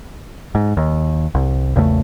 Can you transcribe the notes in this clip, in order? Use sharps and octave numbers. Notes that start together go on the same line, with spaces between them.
G#2
D#2
C2
A#1 E2 C#3 A3